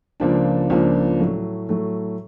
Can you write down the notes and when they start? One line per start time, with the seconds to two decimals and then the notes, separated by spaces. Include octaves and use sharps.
0.20 C#2 C#3 F3 A#3 D4
0.70 C#2 C#3 F3 A#3 D4
1.19 A2 F#3 A3
1.69 A2 F#3 A3